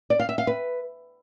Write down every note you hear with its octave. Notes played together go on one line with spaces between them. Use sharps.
D5
F5
E5
F5
B4